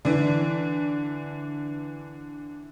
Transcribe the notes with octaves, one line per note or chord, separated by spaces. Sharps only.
D3 E3